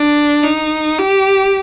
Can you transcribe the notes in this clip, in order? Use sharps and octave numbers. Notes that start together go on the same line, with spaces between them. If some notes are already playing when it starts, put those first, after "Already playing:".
Already playing: D4
D#4
G4